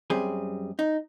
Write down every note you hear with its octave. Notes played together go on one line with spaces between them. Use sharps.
F#2 G3 C4 G#4
D#4